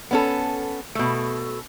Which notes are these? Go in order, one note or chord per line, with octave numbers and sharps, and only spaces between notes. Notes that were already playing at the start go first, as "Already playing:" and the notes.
B3 C#4 A4
B2 A3